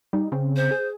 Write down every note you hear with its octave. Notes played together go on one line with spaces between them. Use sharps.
G3 D#4
C#3 C4
C5
G#4